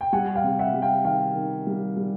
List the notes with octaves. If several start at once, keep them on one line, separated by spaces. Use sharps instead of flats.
G5
G3 F#5 G#5
F5 G5
C3
E5 F#5
G3
F5 G5
D#3 F5 G5
D#3
G3
G3